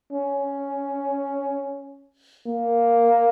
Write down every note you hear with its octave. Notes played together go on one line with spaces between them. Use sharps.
C#4
A#3